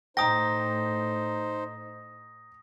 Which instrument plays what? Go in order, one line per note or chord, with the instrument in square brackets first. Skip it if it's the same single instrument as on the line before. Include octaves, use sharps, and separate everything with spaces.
[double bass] A2 [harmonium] D#4 C5 [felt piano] G5 A#5 [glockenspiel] D#6 A#6